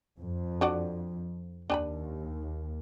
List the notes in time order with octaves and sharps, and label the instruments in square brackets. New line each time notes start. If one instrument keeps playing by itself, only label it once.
[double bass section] F2
[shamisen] D4 F#4 D5
[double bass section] D#2 [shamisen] D4 G#5 B5